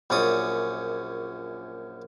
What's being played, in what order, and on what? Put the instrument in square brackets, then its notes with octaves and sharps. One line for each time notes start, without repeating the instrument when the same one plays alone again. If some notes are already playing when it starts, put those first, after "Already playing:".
[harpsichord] A#1 F#2 C#4 D5 D#6